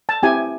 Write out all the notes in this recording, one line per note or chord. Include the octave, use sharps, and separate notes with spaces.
A5
C4 E4 G4 G#5